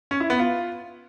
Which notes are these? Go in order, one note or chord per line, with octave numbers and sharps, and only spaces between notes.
C#4
E4
B3
F4